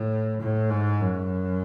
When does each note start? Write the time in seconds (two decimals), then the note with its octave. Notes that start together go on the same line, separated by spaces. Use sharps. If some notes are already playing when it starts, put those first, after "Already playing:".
Already playing: A2
0.41 A2
0.70 G#2
1.00 F#2